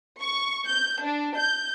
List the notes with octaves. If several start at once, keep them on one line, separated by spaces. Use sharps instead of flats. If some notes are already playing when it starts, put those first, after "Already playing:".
C#6
G6
D4
G6